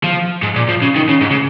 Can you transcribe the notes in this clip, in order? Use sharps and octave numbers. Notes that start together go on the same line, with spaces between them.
F3
G#2
A#2
F3
C#3
D#3
C#3
G#2
C#3